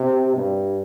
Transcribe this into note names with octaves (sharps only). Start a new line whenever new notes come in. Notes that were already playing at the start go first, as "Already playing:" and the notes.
Already playing: C3
G2